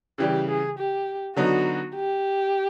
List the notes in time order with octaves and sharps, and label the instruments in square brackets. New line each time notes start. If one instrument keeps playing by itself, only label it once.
[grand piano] C#3 E3 G3 [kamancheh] G4
[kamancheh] G#4
G4
[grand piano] D3 F#3 B3 D#4 [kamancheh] F#4
[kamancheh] G4